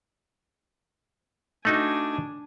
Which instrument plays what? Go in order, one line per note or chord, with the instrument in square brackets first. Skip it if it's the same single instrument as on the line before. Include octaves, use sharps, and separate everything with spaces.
[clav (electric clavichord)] A3 D#4 F#4 [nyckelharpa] D4 G#5